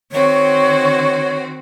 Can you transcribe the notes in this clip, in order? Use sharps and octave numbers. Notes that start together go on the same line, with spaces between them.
D#3 C4 F#4 C#5